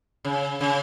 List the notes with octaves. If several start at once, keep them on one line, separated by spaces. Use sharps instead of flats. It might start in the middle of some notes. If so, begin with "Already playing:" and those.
C#3
C#3